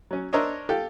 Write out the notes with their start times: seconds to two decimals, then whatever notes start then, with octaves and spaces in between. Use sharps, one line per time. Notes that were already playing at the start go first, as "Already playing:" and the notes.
0.11 F#3 C#4
0.33 D4 A#4 C5 C#5 D#5 E5
0.69 F4 G4 A4